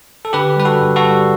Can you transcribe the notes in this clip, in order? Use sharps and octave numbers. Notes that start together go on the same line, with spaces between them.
A4
D3 G4 B4
G3 B4
F#4 A4
G2
F#4 A4
G3